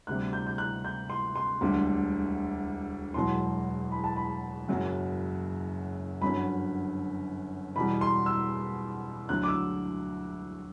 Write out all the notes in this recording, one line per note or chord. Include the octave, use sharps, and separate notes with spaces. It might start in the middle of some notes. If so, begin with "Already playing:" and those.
D2 C3 G3 F#6
G6
G6
F#6
G6
C6
C6
E1 D2 D3 G3
E1 E2 B2 F#3 C6
B5
A5
B5
F#1 F#2 F#3
G1 F#2 D3 F#3 B5
E2 B2 G3 B5
C6
E6
D2 D3 F#3 F#6
D6
E6